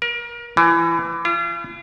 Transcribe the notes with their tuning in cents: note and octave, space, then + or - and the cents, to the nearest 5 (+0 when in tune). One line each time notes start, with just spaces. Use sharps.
A#4 +30
E3 +25
F4 -40